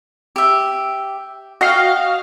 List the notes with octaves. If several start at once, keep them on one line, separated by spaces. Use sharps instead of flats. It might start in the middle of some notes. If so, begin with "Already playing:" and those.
G4 E5
F#4 D#5 F5 G5 F6